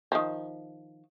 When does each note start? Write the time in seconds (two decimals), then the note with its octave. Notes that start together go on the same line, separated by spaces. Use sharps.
0.12 D#3 F3